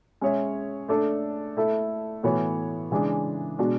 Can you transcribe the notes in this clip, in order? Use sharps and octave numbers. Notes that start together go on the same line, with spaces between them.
G#3 C#4 G#4 C#5 E5
A3 D4 A4 D5
A3 E4 A4
A2 E3 B3 F#4 C#5
C#3 E3 G#3 D4 G#4
B2 G#3 D4 F#4